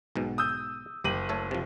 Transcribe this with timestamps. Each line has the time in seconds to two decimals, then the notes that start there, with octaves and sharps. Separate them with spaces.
0.16 B1 G#2 B2
0.38 D#6 E6 G6
1.04 F#1 G4 A#5 D#7 F#7
1.29 A3 A4 C#5
1.51 C3 F3